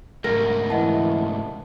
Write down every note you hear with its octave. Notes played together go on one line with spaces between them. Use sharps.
D2 G#2 A#4 A#6
E3 D#5 F#5 A5